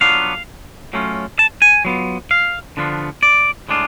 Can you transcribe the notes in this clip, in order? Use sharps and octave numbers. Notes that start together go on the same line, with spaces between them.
F#3 B3 D4 F4 F5
F#3 A3 C#4 F4
A5
G#5
F#3 B3 F4
F5
D3 F3 B3 D4 F4
D5
A2 G#3 D4 F4